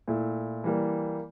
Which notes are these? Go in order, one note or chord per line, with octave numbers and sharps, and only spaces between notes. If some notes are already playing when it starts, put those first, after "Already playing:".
A#2 A3 E4
E3 G3 A#3